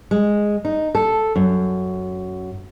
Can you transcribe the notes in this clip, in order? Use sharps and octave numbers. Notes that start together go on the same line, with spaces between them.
G#3
D#4
A4
F#2